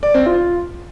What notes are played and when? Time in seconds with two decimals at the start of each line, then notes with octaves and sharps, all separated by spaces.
0.03 D5
0.14 C4
0.26 F4